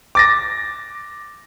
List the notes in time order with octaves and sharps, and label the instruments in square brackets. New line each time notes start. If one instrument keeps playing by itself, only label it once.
[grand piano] D6 A6 A#6